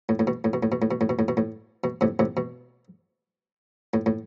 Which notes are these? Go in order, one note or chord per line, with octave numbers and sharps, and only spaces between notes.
A2
A2
B2
A2
B2
A2
B2
A2
B2
A2
B2
A2
B2
A2
B2
A2 C3
A2 C3
B2
A2
A2